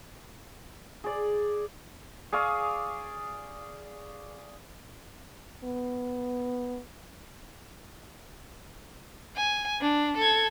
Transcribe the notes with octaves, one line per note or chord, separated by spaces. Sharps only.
G#4 D5
G#4 D5 F5 C#6
B3
G#5
D4
A4 G#6